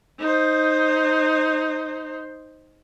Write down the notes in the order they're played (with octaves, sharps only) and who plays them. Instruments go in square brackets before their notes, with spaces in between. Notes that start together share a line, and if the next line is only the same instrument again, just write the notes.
[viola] D#4 C5